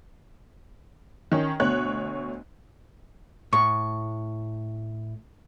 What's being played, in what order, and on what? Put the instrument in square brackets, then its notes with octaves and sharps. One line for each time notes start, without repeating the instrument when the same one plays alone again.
[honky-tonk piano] D#3 C#4
D2 B2 C#5 F#6
[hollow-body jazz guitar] A2 [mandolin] C#6